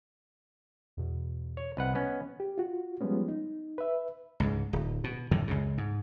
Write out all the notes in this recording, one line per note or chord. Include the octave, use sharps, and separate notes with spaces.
E2 B2
C#5
C2 B4 D#5 F#5
B3 C#4
G4
F4 F#4
F3 G3 G#3 B3 C#4
D#4
B4 E5
C#2 G#2
D1
B2
F#2 A2 D3 D#3
C#2 F#2 C#3
G#2